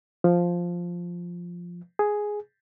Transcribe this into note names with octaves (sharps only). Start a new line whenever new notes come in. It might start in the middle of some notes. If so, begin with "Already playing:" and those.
F3
G#4